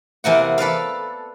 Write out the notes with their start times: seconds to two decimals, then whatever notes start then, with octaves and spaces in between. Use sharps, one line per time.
0.24 E2 C3 A#3 F#5
0.58 A4 B4 D5 F5